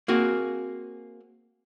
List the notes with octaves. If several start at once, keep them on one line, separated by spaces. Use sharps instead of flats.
A#3 C4 F#4 G#4